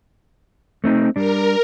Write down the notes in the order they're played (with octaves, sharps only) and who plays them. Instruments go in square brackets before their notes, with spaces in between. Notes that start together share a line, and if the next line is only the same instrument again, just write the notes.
[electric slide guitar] A3 C4 D#4
[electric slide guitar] G3 D4 [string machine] A#4